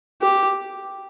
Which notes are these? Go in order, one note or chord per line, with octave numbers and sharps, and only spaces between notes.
G4